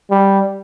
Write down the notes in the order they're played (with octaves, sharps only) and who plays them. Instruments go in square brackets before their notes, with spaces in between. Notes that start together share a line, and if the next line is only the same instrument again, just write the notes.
[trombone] G3